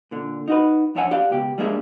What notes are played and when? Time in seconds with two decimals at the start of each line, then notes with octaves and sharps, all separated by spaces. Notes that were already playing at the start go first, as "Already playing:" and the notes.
0.11 A#2 D3
0.48 D#4 F#4 B4
0.95 F2 D4 C#5 E5 F#5 G#5
1.11 G4 D5 F5
1.30 C#2 B2 G4
1.58 G3 G#3 A#3 D4 G#4 E5